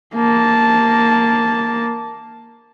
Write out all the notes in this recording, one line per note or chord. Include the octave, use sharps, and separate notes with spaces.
A#3 A5